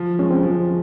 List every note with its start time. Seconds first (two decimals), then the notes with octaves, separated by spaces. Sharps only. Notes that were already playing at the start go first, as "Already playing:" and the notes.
Already playing: F3
0.19 G#3 C#4
0.31 C4
0.43 F3